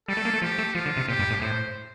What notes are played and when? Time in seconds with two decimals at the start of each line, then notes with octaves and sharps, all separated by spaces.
0.08 G3 A4
0.17 A3
0.25 A#3
0.34 A3
0.42 F3 G4
0.58 A3
0.74 F3 F4
0.86 D3
0.97 C3
1.08 A#2 G4
1.19 G2
1.30 A2
1.41 A2 C5